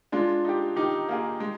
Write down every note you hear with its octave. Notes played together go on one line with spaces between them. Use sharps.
G#3 D4 F4
D#4 G4
D#3 D#4 G4
A#3 F4 G#4
G#3